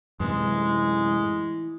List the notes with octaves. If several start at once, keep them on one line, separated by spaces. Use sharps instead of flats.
F#2 A2 C3 E3 G#3